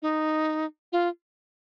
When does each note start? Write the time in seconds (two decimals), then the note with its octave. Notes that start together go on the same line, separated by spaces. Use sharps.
0.02 D#4
0.92 F4